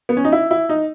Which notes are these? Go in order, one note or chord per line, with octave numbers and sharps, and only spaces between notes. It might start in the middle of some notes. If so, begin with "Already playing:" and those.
B3
C#4
D#4
E4
E4
D#4